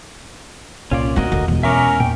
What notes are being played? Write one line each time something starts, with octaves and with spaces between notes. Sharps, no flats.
C2 A#2 C#4 F4 D5
C4 F4 F#4 A#4 D#5
F1 D2 D3
E2 B2 G#3
C#4 A#4 E5 C#6 D6
A#2 G5